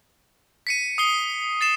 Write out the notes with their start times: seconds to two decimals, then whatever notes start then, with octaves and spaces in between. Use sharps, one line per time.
0.67 B6 C#7 D#7
0.98 D#6 C7 G7
1.61 A6 C7 E7